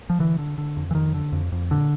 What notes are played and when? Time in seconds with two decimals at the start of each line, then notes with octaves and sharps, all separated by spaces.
0.10 F3
0.20 D3 E3
0.38 D3
0.58 D3
0.77 F2
0.91 E3
0.95 F2 D#3
1.15 D3
1.32 F2
1.52 F2
1.70 A#2 D3